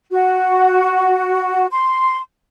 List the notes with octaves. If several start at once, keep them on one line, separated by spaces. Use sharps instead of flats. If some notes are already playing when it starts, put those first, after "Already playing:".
F#4
C6